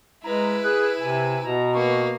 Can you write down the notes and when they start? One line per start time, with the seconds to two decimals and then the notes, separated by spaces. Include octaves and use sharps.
0.24 G#3 E4 B4 A#5
0.64 G#4 F#6
1.00 C3 G#5
1.43 B2 A#5
1.74 A#3 B4 C#6